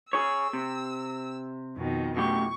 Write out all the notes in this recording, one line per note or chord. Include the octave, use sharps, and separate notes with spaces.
G#4 C#5 E6
C3
F2 B2 D#3
F#2 A2 G4 C#6